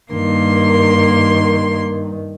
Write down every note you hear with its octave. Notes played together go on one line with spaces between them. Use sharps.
G2 D#3 A#3 C6